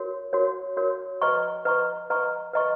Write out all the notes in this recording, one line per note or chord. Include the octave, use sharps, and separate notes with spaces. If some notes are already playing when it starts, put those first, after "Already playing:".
Already playing: F#4 A#4 C#5
F#4 A#4 C#5
F#4 A#4 C#5
B4 D#5 A#5 C#6
B4 D#5 A#5 C#6
B4 D#5 A#5 C#6
B4 D#5 A#5 C#6